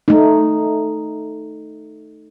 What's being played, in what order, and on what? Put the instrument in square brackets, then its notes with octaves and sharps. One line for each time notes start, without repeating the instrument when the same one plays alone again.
[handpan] A3 D#4